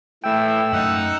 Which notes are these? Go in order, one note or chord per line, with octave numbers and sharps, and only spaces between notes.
A2 E3 A3 G5 E6
F#2 D#4 F#5